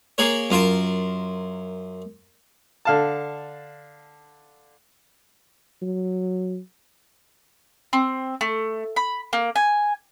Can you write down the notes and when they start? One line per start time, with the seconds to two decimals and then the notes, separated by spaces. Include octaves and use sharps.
0.18 A#3 G#4 A#4 C#5
0.50 F#2 F4 A#4 A5
2.85 D3 F5 A5
5.82 F#3
7.93 C4
8.41 A3
8.96 B5
9.33 A#3
9.56 G#5